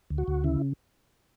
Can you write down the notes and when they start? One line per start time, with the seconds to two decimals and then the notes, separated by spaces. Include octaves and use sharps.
0.10 D2
0.18 F#4
0.28 D2
0.44 C#3 E4